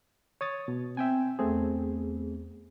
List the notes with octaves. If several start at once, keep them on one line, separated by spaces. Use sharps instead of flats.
C#5 D#6 A6
B2
C4 E5 G5 G#5
E2 A3 C4 G#4